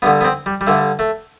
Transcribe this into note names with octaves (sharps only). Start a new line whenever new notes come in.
G2 D3 B3
B3
C4
G3
G3
G2 D3 A3
A3